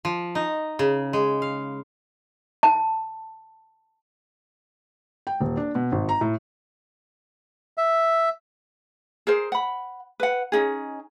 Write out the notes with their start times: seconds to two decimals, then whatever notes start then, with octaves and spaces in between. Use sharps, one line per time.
0.05 F3
0.35 D#4
0.79 C#3
1.13 G#3
1.42 F5
2.63 A5
5.27 G5
5.40 D#1
5.57 D4
5.75 B2
5.92 G#1
6.09 A#5
6.21 A2
7.78 E5
9.27 G#4 A#4 C5
9.52 F#5 B5
10.20 B4 F#5
10.52 C#4 D#4 G#4